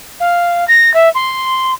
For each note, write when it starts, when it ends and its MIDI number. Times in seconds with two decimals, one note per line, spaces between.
0.20 0.64 77
0.68 0.92 94
0.93 1.09 76
1.14 1.71 84